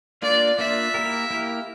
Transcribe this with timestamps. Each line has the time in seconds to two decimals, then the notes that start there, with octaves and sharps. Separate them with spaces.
0.22 A#3 D4 F4 D5
0.59 A#3 D4 F4 E5
0.94 A#3 E4 G4 A#4
1.31 A#3 E4 G4 A#4